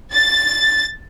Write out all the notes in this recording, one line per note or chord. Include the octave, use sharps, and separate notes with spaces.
A6